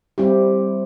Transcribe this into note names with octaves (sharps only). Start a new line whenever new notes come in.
G3 C4 E4 G4